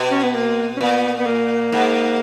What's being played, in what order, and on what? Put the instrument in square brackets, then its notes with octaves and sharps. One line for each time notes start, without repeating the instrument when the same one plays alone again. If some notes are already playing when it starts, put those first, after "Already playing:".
Already playing: [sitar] B2
[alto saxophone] C#4
B3
A#3
C#4
[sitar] A#2 [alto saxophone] B3
[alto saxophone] B3
A#3
[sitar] G#2